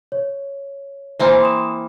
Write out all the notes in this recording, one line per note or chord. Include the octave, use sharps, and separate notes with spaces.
C#5
E3 A#3 C4 C5 G#5
C6 D#6 E7